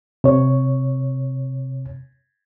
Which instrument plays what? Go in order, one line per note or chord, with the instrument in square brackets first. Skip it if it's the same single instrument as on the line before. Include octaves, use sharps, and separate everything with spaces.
[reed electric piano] C3 C#5